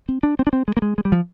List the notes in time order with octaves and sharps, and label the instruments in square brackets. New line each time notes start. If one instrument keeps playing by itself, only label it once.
[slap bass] C4
D4
C4
D4
C4
G#3
A#3
G#3
G#3
G3
F3